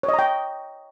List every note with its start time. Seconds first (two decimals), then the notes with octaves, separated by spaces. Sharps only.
0.03 C#5
0.08 D#5
0.14 A#5
0.19 G5